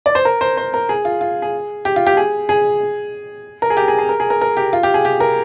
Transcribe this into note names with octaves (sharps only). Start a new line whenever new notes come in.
D5
C5
A#4
C5
C5
A#4
G#4
F4
F4
G#4
G4
F4
G4
G#4
G#4
A#4
G#4
G4
G#4
G#4
A#4
G#4
A#4
A#4
G4
F4
G4
G#4
G4
A#4